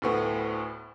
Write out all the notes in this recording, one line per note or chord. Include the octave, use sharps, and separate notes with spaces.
D2 A2 B3